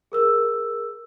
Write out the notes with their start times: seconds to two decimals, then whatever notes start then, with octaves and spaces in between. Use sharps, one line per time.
0.12 G#4 A#4 E6